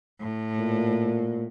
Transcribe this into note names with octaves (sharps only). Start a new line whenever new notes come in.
A2
A#2